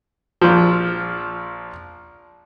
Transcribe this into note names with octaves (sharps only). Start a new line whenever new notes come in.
A#1 F3